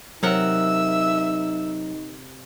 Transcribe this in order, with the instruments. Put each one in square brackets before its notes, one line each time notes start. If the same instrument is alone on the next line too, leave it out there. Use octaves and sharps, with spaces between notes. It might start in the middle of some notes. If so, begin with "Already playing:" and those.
[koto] C3 A#4 F#5 [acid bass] F#3 [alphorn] D#4 [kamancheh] E5 E6